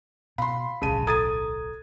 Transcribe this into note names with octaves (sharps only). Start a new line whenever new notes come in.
B2 F5 B5 C6
D1 B1 C#3 A5 D#7
A4 A#5 D#6 G#6 A6 D#7